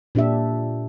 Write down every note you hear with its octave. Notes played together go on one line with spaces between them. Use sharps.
A#2 D4 G4 E5